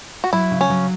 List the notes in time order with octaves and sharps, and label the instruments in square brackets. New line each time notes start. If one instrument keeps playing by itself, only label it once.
[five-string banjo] F#4
[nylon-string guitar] F#3 [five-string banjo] E4
[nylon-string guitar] C#3
[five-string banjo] C#4
[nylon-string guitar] F#3